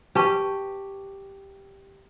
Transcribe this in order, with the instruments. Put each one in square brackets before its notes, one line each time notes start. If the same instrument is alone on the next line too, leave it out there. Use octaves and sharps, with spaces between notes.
[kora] G4 [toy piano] B4 A5 C#6